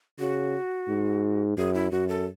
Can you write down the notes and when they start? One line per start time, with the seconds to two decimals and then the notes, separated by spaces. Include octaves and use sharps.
0.19 C#3 F#4
0.89 G#2
1.58 F#2 G#4
1.74 E4
1.92 F#2 F#4
2.09 A4